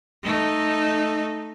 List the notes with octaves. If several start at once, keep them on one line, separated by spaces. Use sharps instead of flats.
A3 D#4